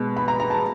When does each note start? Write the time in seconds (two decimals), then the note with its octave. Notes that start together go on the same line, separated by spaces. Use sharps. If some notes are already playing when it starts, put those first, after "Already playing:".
Already playing: B2 G#3
0.17 B5
0.28 A#5
0.40 A#5
0.50 A5